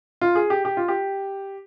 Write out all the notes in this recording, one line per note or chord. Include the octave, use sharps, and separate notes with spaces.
F4
G#4
G4
G4
F4
G4